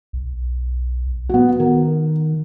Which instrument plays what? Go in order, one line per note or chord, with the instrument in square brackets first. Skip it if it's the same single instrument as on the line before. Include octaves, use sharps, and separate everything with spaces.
[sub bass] B1
[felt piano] B3 F#4
[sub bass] D#3 [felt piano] A#4